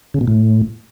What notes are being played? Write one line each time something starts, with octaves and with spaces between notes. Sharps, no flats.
C#3
B2
A2